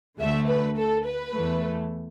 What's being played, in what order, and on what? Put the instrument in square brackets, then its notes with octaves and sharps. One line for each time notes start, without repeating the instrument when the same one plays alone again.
[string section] D2 D3 A3 E5
B4
A4
B4
E2 E3 A3